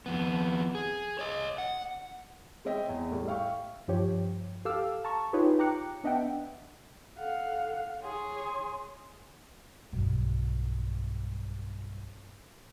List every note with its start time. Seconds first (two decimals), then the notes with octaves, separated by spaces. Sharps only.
0.06 F2 B3
0.75 G#4
1.19 C#5 D#5
1.58 F#5
2.65 G#3 C4 C#5 D#5 E5 G5
2.89 E2
3.11 A2 G3
3.27 E5 F5 G5 C#6
3.88 G2 F3 G4 C#5
4.65 G4 A4 F5 D6 E6 F6
5.05 A5 A#5 C#6
5.33 D#4 F4 G4 G#4 B4 C#5
5.59 G5 A#5 D6 F#6 C#7
6.04 B3 D4 D#5 E5 F#5 G5
7.18 A4 F5 F#5
8.02 G#4 C#5 C6
9.93 B1 G2